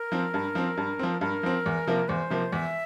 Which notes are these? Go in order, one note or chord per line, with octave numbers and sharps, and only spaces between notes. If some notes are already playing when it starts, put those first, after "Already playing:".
Already playing: A#4
F3 C4
G2
F3 C4
G2
F3 C4
G2 A#4
F3 C4
E2
C3 F3 A#3
E2 C5
C3 F3 A#3
E2 E5